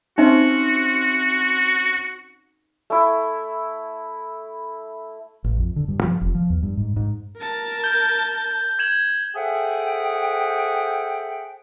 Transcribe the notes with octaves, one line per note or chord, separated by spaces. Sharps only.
C4 C#4 D#4 F#4 E5
A3 E4
A1
F2
D3
G2
F3
F1
F3
E2
G2
G#2
G#2
A#4 A5
G6 G7
G#6 E7 F#7
G#4 A4 C5 E5 F#5 G5